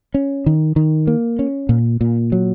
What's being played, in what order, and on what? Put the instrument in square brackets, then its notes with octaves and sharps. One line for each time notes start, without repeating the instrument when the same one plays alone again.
[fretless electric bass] C#4
D#3
D#3
A#3
C#4
A#2
A#2
F#3